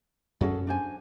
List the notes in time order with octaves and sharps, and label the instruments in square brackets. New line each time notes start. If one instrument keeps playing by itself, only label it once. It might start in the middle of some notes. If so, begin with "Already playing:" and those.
[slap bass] F#2 C#4 [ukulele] F#4 G#4 A4
[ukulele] D4 C5 G#5